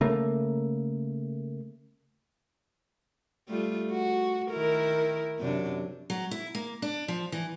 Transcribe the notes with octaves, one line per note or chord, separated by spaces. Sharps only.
C#3 A3 A#3
G3 A3 F4
F#4
D#3 E4 A#4
F#2 C3 D4
F#3
E4
A#3
D4
F3
E3